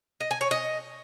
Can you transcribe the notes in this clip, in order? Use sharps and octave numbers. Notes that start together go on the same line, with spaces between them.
D#5
G#5
C#5
D#5